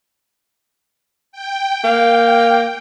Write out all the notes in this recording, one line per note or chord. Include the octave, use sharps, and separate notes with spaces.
G5
A#3